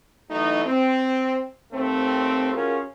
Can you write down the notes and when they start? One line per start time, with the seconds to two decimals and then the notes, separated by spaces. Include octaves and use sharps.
0.31 E3 F#3 A3 D#4
0.66 C4
1.73 D#2 A3 C4
2.54 C#4 F4 F#4 G#4 A#4